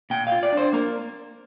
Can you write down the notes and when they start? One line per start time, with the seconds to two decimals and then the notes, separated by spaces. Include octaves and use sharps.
0.10 A#2 G5
0.27 F5
0.32 F4
0.43 D5
0.52 D4
0.57 C5
0.73 A#3 A#4